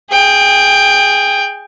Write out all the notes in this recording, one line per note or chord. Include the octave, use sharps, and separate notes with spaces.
G#4 G5